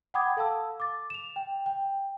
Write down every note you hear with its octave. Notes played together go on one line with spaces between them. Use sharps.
F#5 G5 B5 D6 D#6 G#6
A4 F5 A5 E6
D6 A6
E7 F7
G5
G5